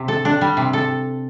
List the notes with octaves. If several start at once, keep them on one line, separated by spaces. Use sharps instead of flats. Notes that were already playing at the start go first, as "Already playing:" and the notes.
Already playing: C3
A4
D4
G3
C3
A4